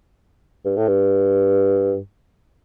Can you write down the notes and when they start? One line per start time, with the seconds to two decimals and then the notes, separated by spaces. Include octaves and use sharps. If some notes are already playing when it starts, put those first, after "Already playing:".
0.65 G2
0.77 A2
0.88 G2